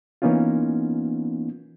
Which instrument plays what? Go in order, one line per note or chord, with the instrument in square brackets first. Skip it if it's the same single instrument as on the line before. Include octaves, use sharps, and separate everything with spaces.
[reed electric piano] E3 A#3 B3 C#4 D#4 F4